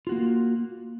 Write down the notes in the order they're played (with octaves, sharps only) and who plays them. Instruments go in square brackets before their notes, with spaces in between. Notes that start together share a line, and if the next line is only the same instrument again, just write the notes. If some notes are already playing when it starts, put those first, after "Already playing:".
[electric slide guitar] F4
F#4
A#3